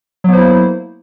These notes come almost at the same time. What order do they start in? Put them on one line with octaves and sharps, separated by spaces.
F#3 B3 C5 E4 A#3